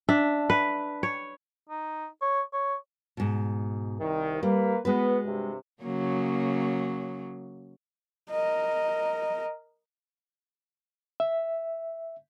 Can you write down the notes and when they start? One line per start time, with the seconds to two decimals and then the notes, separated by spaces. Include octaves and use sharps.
0.09 D4 E5
0.50 B4
1.03 C#5
1.69 D#4
2.22 C#5
2.53 C#5
3.17 G#2 B2
4.00 C2 D#3
4.43 G3 A#3 B4
4.85 G#3 B3 F#4 B4
5.25 G2 C3
5.82 C#3 F#3 A#3
8.30 A#4 D#5
11.20 E5